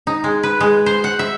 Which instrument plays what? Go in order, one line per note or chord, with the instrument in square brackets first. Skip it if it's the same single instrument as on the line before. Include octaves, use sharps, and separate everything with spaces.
[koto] D#4
G#3
B4
G#3
C5
F#5
E5